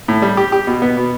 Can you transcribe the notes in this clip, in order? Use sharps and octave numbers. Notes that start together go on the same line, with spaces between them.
A2
G3
G4
G4
B2
B3
B2